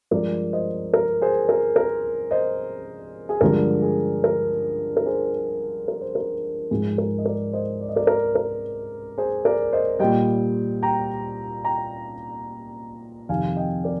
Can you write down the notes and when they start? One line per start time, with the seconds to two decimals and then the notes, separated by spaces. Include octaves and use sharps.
0.11 G2 F3 G#3 A#4 D5
0.53 C5 D#5
0.94 A#4
1.22 G#4 C5
1.49 A#4
1.76 A#4
2.31 C5 D#5
3.29 G#4
3.41 G2 D3 F3 G#3 A#4
3.82 G#4
4.24 A#4
4.97 A#4
5.06 G#4 C5
5.88 A#4
6.01 C5
6.15 A#4
6.71 G#2 F3 G#3 G#4
6.98 A#4
7.18 D#5
7.26 A#4 D5
7.53 C5 D#5
7.81 D5
7.89 D#5
7.95 A#4 D5
8.07 A#4
8.35 A#4
9.18 G#4 C5
9.45 A#4 D5
9.73 C5 D#5
9.99 A#2 G3 D#5 G5
10.82 G5 A#5
11.65 G5 A#5
13.29 F2 C3 D#3 F5 G#5
13.56 D#5 G5
13.84 A#4 D5